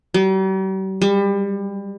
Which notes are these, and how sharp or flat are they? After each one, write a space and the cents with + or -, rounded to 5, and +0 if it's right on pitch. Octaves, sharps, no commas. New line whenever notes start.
G3 -45
G3 +30